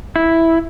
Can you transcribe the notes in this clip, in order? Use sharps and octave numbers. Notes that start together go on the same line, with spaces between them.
E4